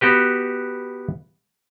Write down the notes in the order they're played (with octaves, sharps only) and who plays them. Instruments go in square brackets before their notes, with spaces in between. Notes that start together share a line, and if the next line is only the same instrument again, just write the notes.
[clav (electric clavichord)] B3 F#4 G4 B4